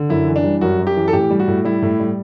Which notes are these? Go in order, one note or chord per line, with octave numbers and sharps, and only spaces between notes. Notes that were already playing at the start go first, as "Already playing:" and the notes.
Already playing: D3
F#2 E4
E3
D4
G3
F#2 F#4
F#2
G4
E3
A4
A2 G4
G3
F#4
A2
G3 E4
A2
G3